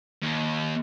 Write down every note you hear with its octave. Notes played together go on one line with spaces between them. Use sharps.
D#2